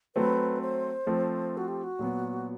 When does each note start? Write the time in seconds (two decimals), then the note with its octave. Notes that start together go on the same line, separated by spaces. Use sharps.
0.16 F#3 A3 C4 B4
0.61 C5
1.07 F3 A3 C4
1.57 F#4
1.68 G4
1.84 F#4
1.99 A#2 F#3 B3